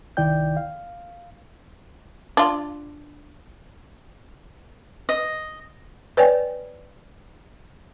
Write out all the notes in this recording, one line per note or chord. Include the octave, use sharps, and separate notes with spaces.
C2 D#3 E4 D5 G5 G6
F5
D4 F4
D#5
B4 C#5 D5 G5 G#5